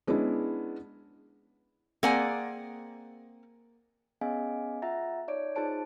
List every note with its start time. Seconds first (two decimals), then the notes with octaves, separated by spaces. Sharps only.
0.07 G#3 B3 C#4 D4 E4
2.03 A#3 C4 G#4 D5 F#5 G#5
4.21 B3 C#4 G#4 D#5 F5 G#5
4.82 F4 E5 F#5 A#5 A6
5.28 D#4 C#5 D5 D7
5.56 D#4 F4 G#4 C5 A5 D7